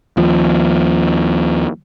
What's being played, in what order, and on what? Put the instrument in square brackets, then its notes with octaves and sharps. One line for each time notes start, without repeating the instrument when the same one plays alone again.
[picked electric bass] D#2 F3